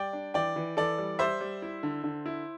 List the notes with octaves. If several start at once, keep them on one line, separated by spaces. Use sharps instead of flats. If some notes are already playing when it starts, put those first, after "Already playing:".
Already playing: G3 D5 G5
D4
E3 D5 G5
E3
E3 A4 D5
G3
G3 C5 E5
G3
E4
D3
D3
E4